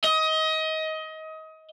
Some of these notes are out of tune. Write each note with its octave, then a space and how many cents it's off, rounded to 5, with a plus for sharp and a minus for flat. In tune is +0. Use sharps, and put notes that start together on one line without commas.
D#5 +25